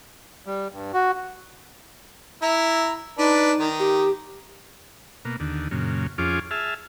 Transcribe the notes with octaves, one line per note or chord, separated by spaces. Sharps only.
G3
G2
F#4
E4 A#5
D4 D#4 B4
D#3
G4
B2 A#3
D#2 D3
F#2 A#2 C#3
F2 C#4 F4 G#4 D6
G#4 E5 A5 F6